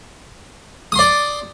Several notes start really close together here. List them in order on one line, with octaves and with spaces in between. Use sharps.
D#6 C6 D5